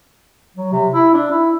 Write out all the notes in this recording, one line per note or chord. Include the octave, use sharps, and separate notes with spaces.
F#3
C3
E4
D4
E4